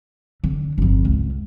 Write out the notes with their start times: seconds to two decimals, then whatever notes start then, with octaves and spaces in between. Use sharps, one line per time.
0.44 D3
0.78 G1 F2
1.05 C#2